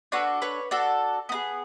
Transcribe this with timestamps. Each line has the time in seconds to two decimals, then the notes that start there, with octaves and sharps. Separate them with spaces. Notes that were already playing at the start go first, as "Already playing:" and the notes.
0.12 D4 F#4 A4 B4 C#5
0.42 B4 C#5
0.71 D4 F#4 A4
1.29 B3 D#4 G#4